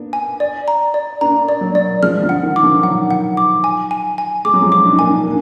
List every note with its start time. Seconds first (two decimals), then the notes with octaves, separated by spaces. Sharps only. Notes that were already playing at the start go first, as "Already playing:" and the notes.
Already playing: A#3 B3 D4
0.13 G#5
0.40 D5
0.68 A#5
0.94 D5
1.21 A#3 D4 A#5
1.49 D5
1.61 F#3 A#3
1.75 D5
2.02 F3 G#3 F6
2.22 D3 F3
2.29 F#5
2.43 D#3
2.56 D6
2.63 D3 F3
2.83 D#3 F#3 F#5
3.11 F#5
3.37 D6
3.64 G#5
3.91 G#5
4.18 G#5
4.45 G#3 D6
4.54 F#3
4.62 F3 G#3
4.72 D6
4.85 D4
4.93 D#4
4.99 A#3 D4 G#5
5.26 A#3 D4